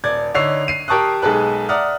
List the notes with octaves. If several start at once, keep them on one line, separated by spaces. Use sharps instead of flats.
D#1 D5 G#6
D3 D#4 C#5 E6 C7 F7
C7 D#7
G4 A#4 A5 C#6 D#6 F#6
B1 G#3 G#4 A4 B4 F#6
D5 E5 F#5 A#5 D#6 F6